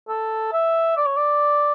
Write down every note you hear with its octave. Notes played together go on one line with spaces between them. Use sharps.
A4
E5
D5
C#5
D5